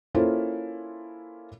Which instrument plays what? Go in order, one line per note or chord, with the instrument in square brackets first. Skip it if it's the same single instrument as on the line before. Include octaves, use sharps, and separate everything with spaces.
[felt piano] A#3 C#4 E4 F4 A4 C5